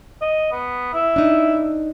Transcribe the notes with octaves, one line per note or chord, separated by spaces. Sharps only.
D#5
B3
E4
D4 D#4